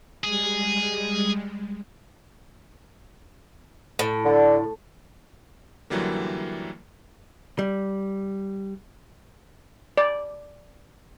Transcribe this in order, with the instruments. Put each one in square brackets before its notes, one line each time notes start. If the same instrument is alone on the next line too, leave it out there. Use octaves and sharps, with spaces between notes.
[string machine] G3 G#3 [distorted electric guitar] G#4
[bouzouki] A2
[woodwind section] D3
[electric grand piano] F#2 D3 E3 F#3 G3 A#3
[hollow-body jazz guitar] G3
[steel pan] D5